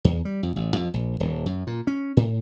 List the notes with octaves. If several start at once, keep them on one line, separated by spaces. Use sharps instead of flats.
E2
G3
F2
A1
F2
A#1
D#1
F#2
A#2
C#4
A2